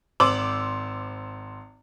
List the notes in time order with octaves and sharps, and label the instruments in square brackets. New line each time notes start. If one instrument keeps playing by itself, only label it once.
[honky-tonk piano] G#1 C5 D6 E6 F#7